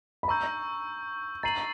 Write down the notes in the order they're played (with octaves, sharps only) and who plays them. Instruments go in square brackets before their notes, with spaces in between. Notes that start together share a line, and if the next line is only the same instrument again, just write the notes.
[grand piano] B5
[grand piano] A#5 [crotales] C#6 E6 G6
[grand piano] A#5 [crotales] A6 C7 D#7 F#7